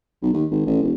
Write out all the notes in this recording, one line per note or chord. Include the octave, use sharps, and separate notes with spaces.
B1
D#2
G#1
A1
E1